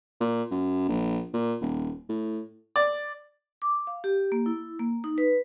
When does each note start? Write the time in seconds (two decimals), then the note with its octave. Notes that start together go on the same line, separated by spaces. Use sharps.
0.21 A#2
0.51 F#2
0.88 A#1
1.34 A#2
1.62 D#1
2.09 A2
2.76 D5
3.62 D6
3.87 F5
4.04 G4
4.32 A#3
4.46 E4
4.79 A#3
5.04 D#4
5.18 B4